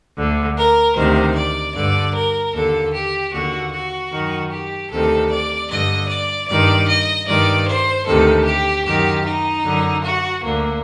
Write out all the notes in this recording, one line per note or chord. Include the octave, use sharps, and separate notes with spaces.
D2 D3
A#4
D2 C3 D#3 C5
D5
G2 D3 D5
A#4
D#2 D3 A4
G4
D#2 D3 F#4
F#4
F#2 D#3
G4
D2 C3 D#3 A4
D5
G2 D3 D#5
D5
G2 D#3 D5
D#5
G2 D#3 D5
C5
D2 C3 D#3 A4
G4
F#2 D#3 G4
D#4
F#2 D3
F#4
D2 D3 A#3